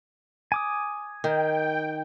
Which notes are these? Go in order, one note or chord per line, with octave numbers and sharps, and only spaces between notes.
G#5 D6 D#6
D#3 G5